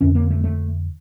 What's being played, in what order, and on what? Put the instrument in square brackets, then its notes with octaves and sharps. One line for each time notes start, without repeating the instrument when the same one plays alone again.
[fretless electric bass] F2 D3 C#4
A#3
A3
A3